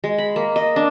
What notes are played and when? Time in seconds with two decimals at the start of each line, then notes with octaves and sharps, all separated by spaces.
0.04 G#3
0.18 B5
0.36 A#3
0.56 D#5
0.76 D4